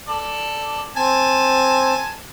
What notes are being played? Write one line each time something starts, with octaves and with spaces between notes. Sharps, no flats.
A4 D5
C4 G#5 A5